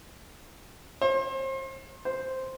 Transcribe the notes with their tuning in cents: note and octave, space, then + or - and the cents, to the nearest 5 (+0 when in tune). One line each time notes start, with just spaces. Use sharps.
C5 +35
C5 +0